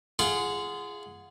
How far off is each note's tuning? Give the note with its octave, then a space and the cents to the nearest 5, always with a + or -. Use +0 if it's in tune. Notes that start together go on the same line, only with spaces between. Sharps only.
F4 -30 G#4 +0 F#5 -15